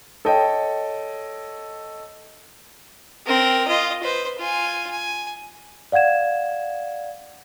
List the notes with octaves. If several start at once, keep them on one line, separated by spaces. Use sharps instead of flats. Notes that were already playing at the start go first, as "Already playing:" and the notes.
A4 C#5 D#5 G5
C4 A#4
F4 D#5
B4 C5
F4 G#5
G#5
D5 F5 F#5 G#6 E7